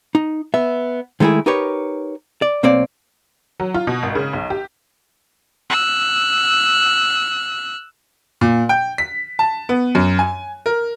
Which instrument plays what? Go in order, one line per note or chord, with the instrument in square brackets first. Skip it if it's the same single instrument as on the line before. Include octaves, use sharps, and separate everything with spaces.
[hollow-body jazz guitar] D#4
B3 E5
D#3 G#3 A3 E4 G#4
D#4 G4 A#4 B4 C#5
D5
B1 A#3 C4 C#5 D5
[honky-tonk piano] F#3
F4
B2
G#1
C#3
B1
G4
[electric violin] E6 F#6
[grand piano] A#2
G5
B6
A5
B3
F#2
G#5
A#4